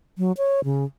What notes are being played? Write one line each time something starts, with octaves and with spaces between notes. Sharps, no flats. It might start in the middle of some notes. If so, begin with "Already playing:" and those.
F#3
C#5
C#3